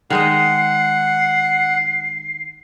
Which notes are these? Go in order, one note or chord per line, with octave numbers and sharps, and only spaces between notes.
D#3 G#3 D#5 F#5 C7